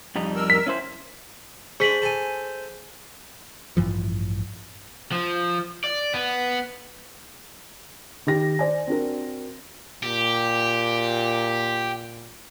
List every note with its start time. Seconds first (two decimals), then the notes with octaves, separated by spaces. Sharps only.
0.15 F2 G3 D#4
0.36 A#4 E6
0.50 B6
0.67 C#4 E4 C5
1.80 G#3 D4 G#4 C5 B6 F#7
2.02 A4 G#5
3.77 A1 G2 E3 F3
5.12 F3
5.84 D5
6.14 B3
8.27 D#3 G4 A#6
8.59 C5 D5 G#5
8.87 C4 D4 F#4 A#4
10.03 A#2 G4